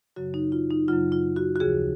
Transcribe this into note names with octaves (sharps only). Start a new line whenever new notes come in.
F#2 C#3 F#3 F#4
D#4
F4
D#4
F#2 C#3 F#3 F4
F4
F#4
F#4
D#2 C#3 F3 G#4